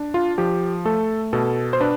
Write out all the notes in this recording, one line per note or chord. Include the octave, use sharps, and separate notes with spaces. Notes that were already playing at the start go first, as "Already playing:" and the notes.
Already playing: D4
F4
F3 G4
A3 A4
B2 A4
C5
D4 B4